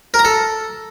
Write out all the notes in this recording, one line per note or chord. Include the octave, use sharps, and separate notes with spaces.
A#4
A#5
A4